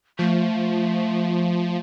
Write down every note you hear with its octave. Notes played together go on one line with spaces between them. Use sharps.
F3 A3